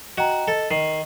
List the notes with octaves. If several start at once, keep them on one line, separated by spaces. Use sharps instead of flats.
F#4 D#5 G5 A#5
A4 D#5
D#3 C7